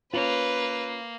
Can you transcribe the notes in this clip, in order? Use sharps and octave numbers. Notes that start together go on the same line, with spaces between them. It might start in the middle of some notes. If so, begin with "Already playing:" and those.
A#3 C#4 F4 B4